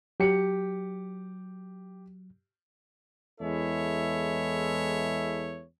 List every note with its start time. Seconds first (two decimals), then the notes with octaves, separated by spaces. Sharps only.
0.20 F#3 G4 C#7
3.41 E2 G#3 E4 A4 C#5 E5